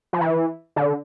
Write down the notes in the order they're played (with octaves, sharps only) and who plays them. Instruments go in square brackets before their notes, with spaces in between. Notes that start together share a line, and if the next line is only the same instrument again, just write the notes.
[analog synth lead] F3
E3
D3